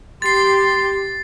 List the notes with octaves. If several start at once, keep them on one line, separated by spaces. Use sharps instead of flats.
G4 C6 A6 C7